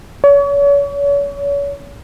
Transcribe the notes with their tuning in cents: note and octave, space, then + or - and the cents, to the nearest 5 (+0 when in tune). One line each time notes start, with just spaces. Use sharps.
C#5 +35